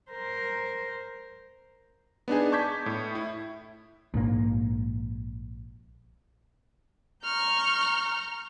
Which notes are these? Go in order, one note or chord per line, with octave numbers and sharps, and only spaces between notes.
A#4 C5
B3 D4 D#4 G#4
A5 C#6 D6 G6 G#6 B6
A2
E4
A#1 G#2 A#3
A#5 C#6 F6 G6